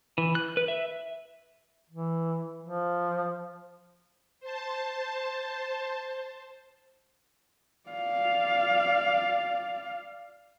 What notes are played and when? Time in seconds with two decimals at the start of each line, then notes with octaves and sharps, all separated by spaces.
0.18 E3
0.35 F#6
0.57 B4
0.68 E5
1.90 E3
2.63 F3
4.40 C5 A5
7.90 D5 F5